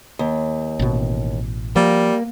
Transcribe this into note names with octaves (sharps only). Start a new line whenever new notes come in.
D#2
A1 B2
F3 G3 A#3